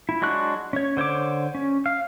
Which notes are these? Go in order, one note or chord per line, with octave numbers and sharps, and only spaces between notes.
E4
F#3 G#3 D4 C#6 F#6
C#4 C#5
D3 C5 C#5 D6
C#4
F5